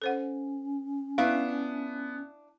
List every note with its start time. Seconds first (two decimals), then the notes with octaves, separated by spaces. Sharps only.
0.02 C#4 A4 C5 F#5
1.18 B3 D4 E4 E5 F5